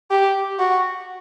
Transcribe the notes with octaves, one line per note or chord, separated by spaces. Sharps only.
G4
F#4